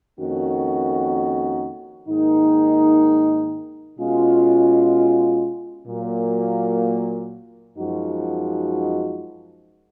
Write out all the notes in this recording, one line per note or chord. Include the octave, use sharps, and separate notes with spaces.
F2 D#3 A#3 C#4 F#4
G#2 D#3 A#3 D#4
B2 G#3 C#4 F4
A#2 F#3 A#3
F#2 F3 G#3 D#4 F#4